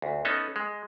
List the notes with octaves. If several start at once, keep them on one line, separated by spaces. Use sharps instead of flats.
D2
B3 C#4 D#4 A4
G#3